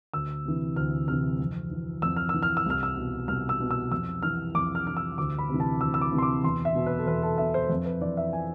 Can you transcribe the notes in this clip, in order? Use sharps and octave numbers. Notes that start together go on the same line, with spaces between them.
D2 E6
C3 E3
D2 F6
C3 E3 F6
F2
E3
F2 E6
F6
E6
E3
F6
E6
C2 F6
E6
B2
C2 F6
E6
B2
E6
F2 E6
E3 F6
F2 D6
F6
E3 F6
E6
D2 D6
B5
C3 E3
A5
D2 E6
E6
D6
C3 E3
C6
D6
E2 C6
E5
B2
B4
A4
E2 B4
A4
B2 E5
C5
F2
B4
E3 D5
E5
G#5